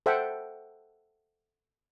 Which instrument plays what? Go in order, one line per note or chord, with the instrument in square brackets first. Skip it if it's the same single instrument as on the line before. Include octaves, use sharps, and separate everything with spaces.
[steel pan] A4 C5 E5 F#5 G5